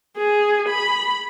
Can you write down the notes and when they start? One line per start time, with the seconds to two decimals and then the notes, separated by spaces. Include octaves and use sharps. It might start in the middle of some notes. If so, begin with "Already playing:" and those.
0.17 G#4
0.69 B5